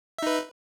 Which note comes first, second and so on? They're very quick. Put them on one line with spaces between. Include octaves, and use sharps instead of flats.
E5 D#4 B4